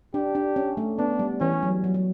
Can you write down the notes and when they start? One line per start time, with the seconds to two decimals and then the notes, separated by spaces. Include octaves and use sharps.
0.14 D4 G4
0.35 D4
0.56 C#4
0.77 A3
0.99 B3 D4
1.19 G3
1.41 E3 C#4
1.53 G3
1.63 F#3
1.84 F#3
1.94 F#3